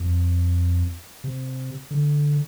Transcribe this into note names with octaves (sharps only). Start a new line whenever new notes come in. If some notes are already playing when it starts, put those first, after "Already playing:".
Already playing: F2
C3
D3